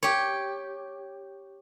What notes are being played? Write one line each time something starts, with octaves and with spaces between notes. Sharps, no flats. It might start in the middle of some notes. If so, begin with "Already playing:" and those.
G4 C#5